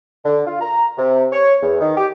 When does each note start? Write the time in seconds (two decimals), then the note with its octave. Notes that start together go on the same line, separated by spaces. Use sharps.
0.25 D3
0.47 F4
0.61 A#5
0.98 C3
1.32 C#5
1.62 E2
1.81 D#3
1.96 G4